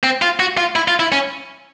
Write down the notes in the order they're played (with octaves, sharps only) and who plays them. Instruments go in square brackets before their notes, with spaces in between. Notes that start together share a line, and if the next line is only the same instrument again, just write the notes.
[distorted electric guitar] C4
F4
F#4
F4
E4
F4
E4
C#4